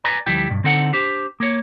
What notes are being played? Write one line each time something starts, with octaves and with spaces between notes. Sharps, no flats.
B4 D5 G#5 A#5
D2 F3 G3 E4 G5
B1 G2
D3 C4 D#4 A4 F#5
D4 G4 C5
A#3 C#5